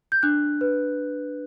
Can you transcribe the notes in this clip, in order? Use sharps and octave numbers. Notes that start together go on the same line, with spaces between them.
G6
D4 F#6
B4